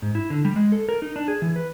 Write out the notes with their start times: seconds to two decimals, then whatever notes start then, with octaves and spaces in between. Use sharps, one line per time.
0.02 G#2
0.15 E4
0.30 D3
0.45 G3
0.56 G#3
0.72 A4
0.89 A#4
1.02 D#4
1.16 D4
1.28 G#4
1.42 E3
1.56 B4